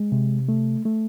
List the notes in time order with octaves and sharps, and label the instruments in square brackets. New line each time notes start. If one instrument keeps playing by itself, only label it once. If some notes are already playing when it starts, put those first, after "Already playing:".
Already playing: [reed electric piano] G#3
C3
A3
A3